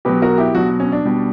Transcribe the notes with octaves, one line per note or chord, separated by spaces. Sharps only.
B2 F#3 G4 B4
F#4 A#4
E4 G4
B2 F#3 D4 F#4
C#4
D4
B2 G3